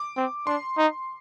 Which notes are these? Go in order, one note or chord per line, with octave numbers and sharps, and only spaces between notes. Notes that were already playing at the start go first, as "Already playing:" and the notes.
Already playing: D6
C4
D4 C6
D#4